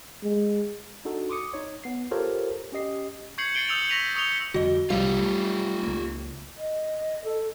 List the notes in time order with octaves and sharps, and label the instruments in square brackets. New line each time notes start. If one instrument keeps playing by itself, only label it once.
[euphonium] G#3
[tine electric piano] D4 D#4 F#4 A4
C6 D6 D#6 C#7
D#4 C#5
B3 C7
F4 G4 A4 A#4 C5 C#5
C#4 G4 D#5 C7
[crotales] C#6 G6 G#6 C7 C#7 F#7
A6 C7 D7 G7
D#6 E6 G6 C#7 F7 F#7
C#6 A#6 B6 D#7 F7
C#6 D#6 C#7 F7 G7
[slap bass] F2 D3 G3 [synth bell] F#4 D#5
[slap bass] C2 F3 [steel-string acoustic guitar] G3 [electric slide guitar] F4 G4 C#5 [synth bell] F5
[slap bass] A3
C#2 A#3
[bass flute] D#5
A4